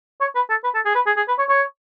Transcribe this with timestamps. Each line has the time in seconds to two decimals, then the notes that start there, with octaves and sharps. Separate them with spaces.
0.21 C#5
0.35 B4
0.50 A4
0.64 B4
0.74 A4
0.85 G#4
0.95 B4
1.06 G#4
1.16 G#4
1.28 B4
1.38 C#5
1.49 C#5